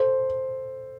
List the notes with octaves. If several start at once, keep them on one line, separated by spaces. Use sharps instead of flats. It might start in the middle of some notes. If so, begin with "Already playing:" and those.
Already playing: A4 C5